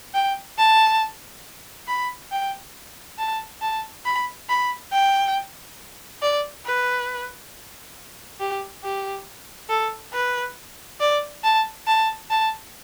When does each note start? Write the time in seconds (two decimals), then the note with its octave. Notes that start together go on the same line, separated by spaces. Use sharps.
0.14 G5
0.58 A5
1.88 B5
2.31 G5
3.18 A5
3.62 A5
4.05 B5
4.49 B5
4.92 G5
6.22 D5
6.66 B4
8.40 G4
8.83 G4
9.69 A4
10.13 B4
11.00 D5
11.44 A5
11.87 A5
12.30 A5